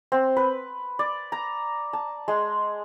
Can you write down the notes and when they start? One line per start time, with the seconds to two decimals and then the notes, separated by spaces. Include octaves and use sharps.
0.12 C4
0.37 B4
0.99 D5
1.32 A#5
1.93 A5
2.28 G#3